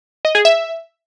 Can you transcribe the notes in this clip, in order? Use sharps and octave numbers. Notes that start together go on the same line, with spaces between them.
D#5
G#4
E5